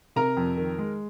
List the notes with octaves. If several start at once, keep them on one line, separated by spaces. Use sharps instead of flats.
C3 A#4 A#5
F2
D#3
G#3